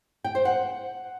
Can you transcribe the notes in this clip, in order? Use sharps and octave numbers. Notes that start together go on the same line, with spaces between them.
G5
C5
F#5